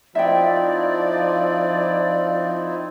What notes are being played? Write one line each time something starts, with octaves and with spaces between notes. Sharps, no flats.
F3 C4 D#4 E4 D5 E5 G5